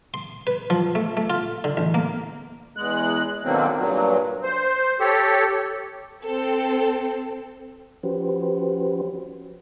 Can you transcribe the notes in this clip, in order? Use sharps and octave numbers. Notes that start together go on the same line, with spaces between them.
C6
B4
F3
A3
A3
F4
D3
A1
A#3
E2 G#3 F#6
B2 D3 D#3 F#3 A#3 C4
G2 A#2 F#3
C5
G4 A4 C#5
C4 A4
F3 C#4 F#4 G4 B4 C5